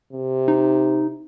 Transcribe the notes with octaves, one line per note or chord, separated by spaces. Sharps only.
C3
D#4